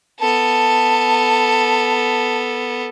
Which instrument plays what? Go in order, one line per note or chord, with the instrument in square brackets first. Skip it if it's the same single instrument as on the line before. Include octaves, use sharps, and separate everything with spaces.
[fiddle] B3 A4 [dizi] A5